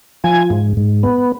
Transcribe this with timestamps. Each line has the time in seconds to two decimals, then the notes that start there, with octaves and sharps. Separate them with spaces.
0.24 F3 G#5
0.50 G#2
0.77 G#2
1.03 B3